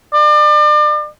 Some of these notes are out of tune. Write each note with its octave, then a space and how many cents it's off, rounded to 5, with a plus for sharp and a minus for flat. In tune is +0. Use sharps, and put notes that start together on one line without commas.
D5 +35